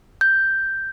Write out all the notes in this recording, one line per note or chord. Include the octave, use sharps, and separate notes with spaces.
G6